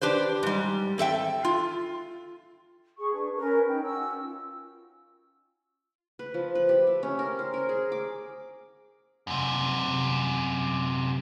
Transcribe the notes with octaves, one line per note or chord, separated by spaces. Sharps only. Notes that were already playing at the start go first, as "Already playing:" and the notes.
D4 G4 B4 C5
G#2 G3
C4 A4 E5 G5
F4
G#4 C#6
D4 B4
C#4 A#4 B4
D#4 G5
C#4 F#4 E6
F4
B4
F3
B4
G4
E5
C#4
A#4
C5
A#4
G#4
D6
F#2 C3